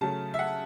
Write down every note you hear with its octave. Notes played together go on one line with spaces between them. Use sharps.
C#3 F#3 A3 A5
E5
F#5